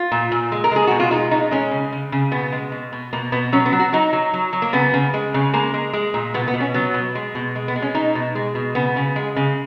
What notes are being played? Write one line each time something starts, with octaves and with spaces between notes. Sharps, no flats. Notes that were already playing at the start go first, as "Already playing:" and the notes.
Already playing: F4
A#2
A#2
G#3
A#4
G#3 G#4
B2 F#4
F4
G#3 D#4
B2 D#4
G#3 C#4
C#3
C#3
C#3
B2 B3
G#3
B2
B2
B2 A#3
B2 B3
F#3 C#4
B3
F#3
F#4
F#3 D#4
F#3
F#3
F#3
A#3
C#3 B3
C#3
G#3
C#3
G#3 A#3
G#3
G#3
A#2
B2 B3
B3
B2
C#4
F#3 B3
B2
G#3
B2
G#3
B3
G#3
C#4
B2 D#4
B2
G#3
B2
C#3 B3
C#3
G#3
C#3